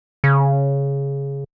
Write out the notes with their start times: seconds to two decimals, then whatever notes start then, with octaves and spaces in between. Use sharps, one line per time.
0.24 C#3